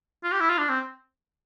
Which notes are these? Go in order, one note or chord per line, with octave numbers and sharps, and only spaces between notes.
F4
G4
E4
F4
D4
C4